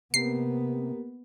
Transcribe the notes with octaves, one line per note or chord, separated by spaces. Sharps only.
C3 A#3 B3 G4 A#4 C7